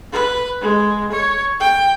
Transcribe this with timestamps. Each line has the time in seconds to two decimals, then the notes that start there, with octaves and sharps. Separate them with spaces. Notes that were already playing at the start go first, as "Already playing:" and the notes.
0.12 B4
0.61 G#3
1.11 C#5
1.60 G5